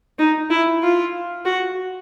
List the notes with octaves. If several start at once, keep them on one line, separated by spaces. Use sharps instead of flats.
D#4
E4
F4
F#4